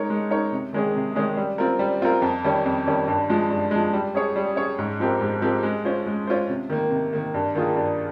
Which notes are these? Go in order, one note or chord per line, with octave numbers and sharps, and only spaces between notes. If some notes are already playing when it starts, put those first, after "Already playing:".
Already playing: G#3 D#4 A#4 C#5
G#3
D#4 A#4 C#5
C3
D#3 G#3 C#4 G#4
C3
D#3 G#3 C#4 G#4
G3
C4 F4 A#4
G3
C4 F4 A#4
F2
D#3 G3 C#4
F2
D#3 G3 C#4
G2
F3 G#3
G2
F3 G#3
G3
C#4 G#4 C#5
G3
C#4 G#4 C#5
G#2
F3 C4 G4 A#4
G#2
F3 C4 G4 A#4
G#3
C#4 F4 C5
G#3
C#4 F4 C5
C3
D#3 A#3
C3
D#3 A#3
G2
D#3 A#3 F4 G#4
G2